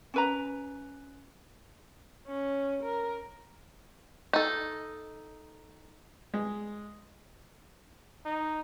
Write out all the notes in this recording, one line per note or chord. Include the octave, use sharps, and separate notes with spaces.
C#4 B4 A#5
C#4
A#4
D#4 A4
G#3
D#4